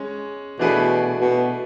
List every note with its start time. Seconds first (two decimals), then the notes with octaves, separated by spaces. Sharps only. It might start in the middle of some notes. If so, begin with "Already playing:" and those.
Already playing: G#3 C#4
0.59 B2 E3 A3 D4 G#4 B4
1.21 B2